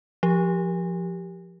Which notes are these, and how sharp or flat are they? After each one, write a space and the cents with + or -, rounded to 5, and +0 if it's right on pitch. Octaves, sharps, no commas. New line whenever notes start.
F3 +0 G4 +0